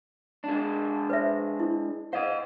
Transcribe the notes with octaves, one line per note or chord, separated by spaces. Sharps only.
G#3 D4
B4 C5 E5
E4
C5 D#5 F5 F#5